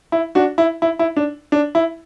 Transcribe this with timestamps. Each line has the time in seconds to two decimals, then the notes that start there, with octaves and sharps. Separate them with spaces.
0.12 E4
0.35 D4 F#4
0.58 E4
0.82 E4
0.99 E4
1.17 D4
1.52 D4
1.75 E4